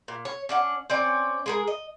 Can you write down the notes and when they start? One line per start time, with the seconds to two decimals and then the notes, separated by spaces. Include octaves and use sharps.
0.08 A#2
0.25 C#5
0.49 C#4 D4 F#5
0.90 C4 C#4 D5
1.46 G#3 G#4 A#4
1.67 D#5